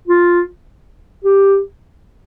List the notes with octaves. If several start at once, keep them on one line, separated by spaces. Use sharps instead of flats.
F4
G4